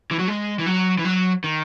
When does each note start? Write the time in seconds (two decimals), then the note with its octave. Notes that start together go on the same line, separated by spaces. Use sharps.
0.11 E3
0.19 F#3
0.28 G#3
0.59 E3
0.66 F#3
0.99 E3
1.05 F#3
1.44 D#3